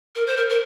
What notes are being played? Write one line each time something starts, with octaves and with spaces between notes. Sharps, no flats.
A#4
C5
A#4
A#4